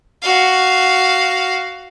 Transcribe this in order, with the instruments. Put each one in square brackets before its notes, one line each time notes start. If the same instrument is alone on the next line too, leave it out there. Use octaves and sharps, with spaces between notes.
[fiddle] F#4 F5